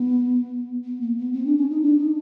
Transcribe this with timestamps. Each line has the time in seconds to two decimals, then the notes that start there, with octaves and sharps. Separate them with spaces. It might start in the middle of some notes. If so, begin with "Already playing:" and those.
Already playing: B3
0.84 B3
1.01 A#3
1.18 B3
1.33 C4
1.46 D4
1.57 C#4
1.70 D#4
1.83 D4
1.99 D#4